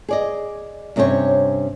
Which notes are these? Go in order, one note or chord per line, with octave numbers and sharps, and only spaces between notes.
G#4 D5 D#5
G2 C3 C#4 C5 C#5